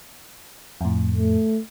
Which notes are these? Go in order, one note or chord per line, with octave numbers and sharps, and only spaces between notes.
F2 A2
A3